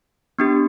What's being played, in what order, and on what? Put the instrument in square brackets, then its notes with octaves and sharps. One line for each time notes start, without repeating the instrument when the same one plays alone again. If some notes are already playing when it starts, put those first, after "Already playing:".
[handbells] B3 D4 G4